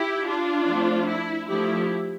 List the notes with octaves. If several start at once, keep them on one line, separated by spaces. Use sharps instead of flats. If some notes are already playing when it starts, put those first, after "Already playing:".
Already playing: E4 G4
D4 F4
F3 A3 C4
E4
F3 A3 D4 E4 G4